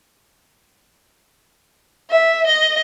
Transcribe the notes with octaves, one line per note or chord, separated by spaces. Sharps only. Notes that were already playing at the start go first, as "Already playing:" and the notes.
E5
D#5